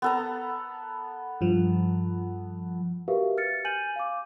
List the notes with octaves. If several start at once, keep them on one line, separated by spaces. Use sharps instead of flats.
B3 A4 A#5
G2 F3
F#4 G4 A#4 B4 E5 F5
F6 A6 C#7
G#5 G6 D#7 F#7
F5 D6